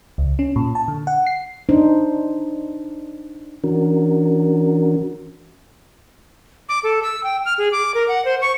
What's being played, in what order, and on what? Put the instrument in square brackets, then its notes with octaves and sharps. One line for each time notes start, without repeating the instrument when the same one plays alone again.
[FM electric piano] C#2
C#4
A#2
A5
D3
F#5
C7
[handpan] D4 D#4 C5
[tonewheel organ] E3 C#4 D4 F#4 A#4
[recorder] D6
A4
E6
G5
F6
G#4
D6
A#4
F#5
C5
C#6